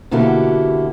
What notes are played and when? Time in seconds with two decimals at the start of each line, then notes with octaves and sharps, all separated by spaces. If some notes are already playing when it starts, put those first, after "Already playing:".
0.11 B2 D3 A#3 E4 F#4 G4